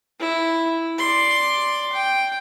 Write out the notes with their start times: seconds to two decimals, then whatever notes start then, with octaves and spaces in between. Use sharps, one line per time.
0.20 E4
0.99 D5 C6
1.93 G5